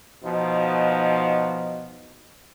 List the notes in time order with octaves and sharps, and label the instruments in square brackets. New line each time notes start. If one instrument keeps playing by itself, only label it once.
[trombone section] B2 F3 D#4